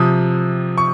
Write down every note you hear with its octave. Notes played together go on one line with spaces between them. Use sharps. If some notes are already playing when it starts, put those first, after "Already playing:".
Already playing: C3 F3 D#6
C#6